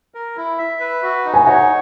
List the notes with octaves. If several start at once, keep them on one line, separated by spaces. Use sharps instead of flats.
A#4
E4
E5
B4
F#4
D#4
G#5
C#5 F#5